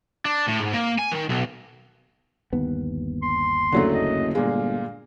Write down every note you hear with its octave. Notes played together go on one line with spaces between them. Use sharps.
D4
A2
G#2
A#3
G#5
D#3
B1
G1 D#2 B3
C6
F#1 D3 F#3 A3
D#5
G1 A#2 G#3 F5